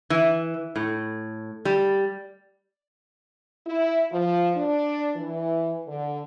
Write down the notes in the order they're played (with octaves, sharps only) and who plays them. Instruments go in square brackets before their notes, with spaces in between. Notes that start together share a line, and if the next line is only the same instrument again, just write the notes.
[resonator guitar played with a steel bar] E3
A2
G3
[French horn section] E4
F3
D4
E3
D3